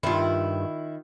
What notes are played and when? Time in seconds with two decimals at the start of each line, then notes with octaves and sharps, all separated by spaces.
0.03 G2 D#3 E4 F4